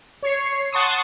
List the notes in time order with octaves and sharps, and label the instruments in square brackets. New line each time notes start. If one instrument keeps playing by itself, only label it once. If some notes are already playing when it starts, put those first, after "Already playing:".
[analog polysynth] C#5 C7
F#5 A5 C6 C#6 D#6